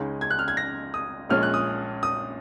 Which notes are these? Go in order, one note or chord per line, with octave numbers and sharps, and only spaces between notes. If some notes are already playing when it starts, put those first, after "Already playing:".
Already playing: C#2 C#3 G#3 D#4
G#6
F#6
F6
G#6
A#6
D#6
A#1 A#2 G#3 C#4 F6
F#6
D#6
D#6